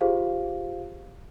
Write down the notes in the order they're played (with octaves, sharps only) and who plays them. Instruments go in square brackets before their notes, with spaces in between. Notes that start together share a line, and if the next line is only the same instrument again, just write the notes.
[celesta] F4 G4 G#4 C5 F5